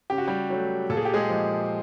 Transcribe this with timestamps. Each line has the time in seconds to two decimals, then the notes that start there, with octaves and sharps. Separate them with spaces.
0.10 C#3 G4
0.18 F#4
0.27 G3 G4
0.50 F#3 A3
0.90 A#2 A4
0.97 G#4
1.05 G4
1.14 G#3 G#4
1.30 F3 G#3